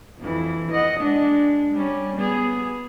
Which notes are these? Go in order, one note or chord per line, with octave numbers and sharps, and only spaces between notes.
F2 E3
D#5 F#5
G#3 D4
G3 C#4
B3 G#4